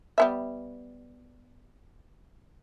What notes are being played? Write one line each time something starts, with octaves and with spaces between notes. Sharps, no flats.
G3 B3 E5